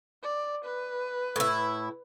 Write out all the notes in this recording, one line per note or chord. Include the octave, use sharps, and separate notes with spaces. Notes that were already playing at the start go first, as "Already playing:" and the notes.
D5
B4
A2 E4